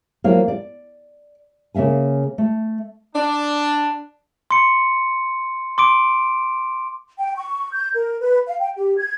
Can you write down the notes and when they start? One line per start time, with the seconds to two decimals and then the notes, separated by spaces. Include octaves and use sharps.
0.24 F3 F#3 A#3 E4 F5
0.48 D5
1.74 C#3 A#3 E5 F5 G#5
2.38 A3
3.15 D4
4.51 C6 C#7
5.78 C6 D6 D7
7.19 G5
7.36 C#6
7.73 G6
7.94 A#4
8.20 B4
8.47 F5
8.60 G5
8.75 G4
8.97 G#6